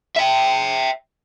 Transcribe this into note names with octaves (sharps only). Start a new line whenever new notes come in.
E5 G5